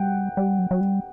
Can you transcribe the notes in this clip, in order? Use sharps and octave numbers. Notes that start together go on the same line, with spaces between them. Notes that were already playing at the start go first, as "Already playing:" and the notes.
Already playing: G3 F#5 G5
G3
F#3
F#3
G3